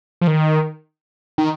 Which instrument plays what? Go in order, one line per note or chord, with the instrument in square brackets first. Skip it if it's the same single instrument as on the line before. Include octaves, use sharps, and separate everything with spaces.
[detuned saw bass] F3
D#3
D#3